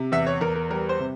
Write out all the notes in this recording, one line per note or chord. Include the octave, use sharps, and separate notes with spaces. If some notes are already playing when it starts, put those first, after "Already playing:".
Already playing: C3
E2 E5
C#5
E2 A#4
A#4
G3 A#4
C5
C3